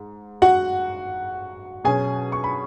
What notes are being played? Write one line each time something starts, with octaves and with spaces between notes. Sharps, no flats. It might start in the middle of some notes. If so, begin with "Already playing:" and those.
Already playing: G#2
F#4 F#5
B2 F#3 C#4 G#4 G#5
C#6
B5